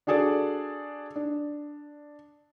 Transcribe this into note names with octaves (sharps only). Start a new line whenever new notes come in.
D4 F#4 G#4 A4 D5
D4